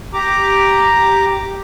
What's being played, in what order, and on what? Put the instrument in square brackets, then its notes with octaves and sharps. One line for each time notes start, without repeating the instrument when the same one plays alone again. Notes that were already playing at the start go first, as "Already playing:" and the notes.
[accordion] G4 A#5 D6